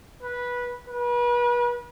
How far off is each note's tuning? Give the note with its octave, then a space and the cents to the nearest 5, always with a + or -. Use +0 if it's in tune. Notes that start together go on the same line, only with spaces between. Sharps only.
B4 -15
B4 -35